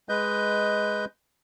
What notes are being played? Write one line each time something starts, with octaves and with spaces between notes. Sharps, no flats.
G#3 B4 D#5 G6